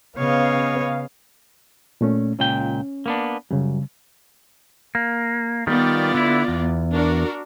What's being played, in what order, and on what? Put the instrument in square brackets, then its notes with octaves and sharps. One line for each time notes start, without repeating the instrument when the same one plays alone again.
[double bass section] C#3 [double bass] B3 [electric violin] C#5 D#5 [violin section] F5
[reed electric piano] A#2 A3 C#4
[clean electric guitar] C#2 A#2 G5 [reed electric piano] C#4
[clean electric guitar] A#3 B3 D4
[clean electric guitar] F#2 [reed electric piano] C#3 G3
[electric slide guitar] A#3
[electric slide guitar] D#3 G3 [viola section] B3 F4 D5
[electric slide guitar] D3 E4
E2
[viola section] D4 F#4 A#4